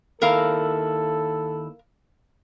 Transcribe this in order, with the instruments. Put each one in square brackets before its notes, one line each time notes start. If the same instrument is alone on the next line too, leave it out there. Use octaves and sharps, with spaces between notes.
[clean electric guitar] D#2 E4 [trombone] A4 [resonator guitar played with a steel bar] A#4 F5 A#5